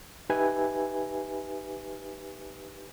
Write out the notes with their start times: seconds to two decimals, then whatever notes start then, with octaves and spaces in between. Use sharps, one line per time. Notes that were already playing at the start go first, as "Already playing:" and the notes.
0.30 D#4 G4 B4 E5 G#5